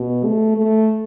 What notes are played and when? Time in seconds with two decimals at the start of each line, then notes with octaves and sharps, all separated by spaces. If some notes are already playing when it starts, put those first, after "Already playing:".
Already playing: B2
0.25 A3
0.57 A3